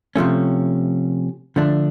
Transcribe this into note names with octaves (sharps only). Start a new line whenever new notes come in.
C3 F3 A3 C#4
D3 F3 A3 D4